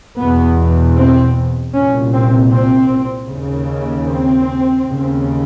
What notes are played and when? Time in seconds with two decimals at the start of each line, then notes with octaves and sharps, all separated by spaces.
0.18 E2 B2 B3
0.97 C4
1.74 C2 A#2 C#4
2.13 C4
2.51 C4
3.28 D#2 C#3
4.06 C4
4.84 D#2 C#3